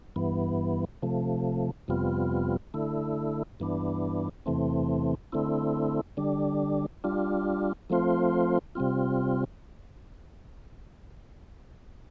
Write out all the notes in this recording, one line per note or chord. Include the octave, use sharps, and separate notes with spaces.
G2 E3 B3
C3 F3 A3
F2 C3 G3 B3 F4
D3 A3 E4
G2 E3 B3 D4
E2 C3 E3 A3 C4
D3 A3 C4 E4
D3 G3 D4
G3 D4 F4
F3 A3 C4 F4 C5
C3 G3 C4 F4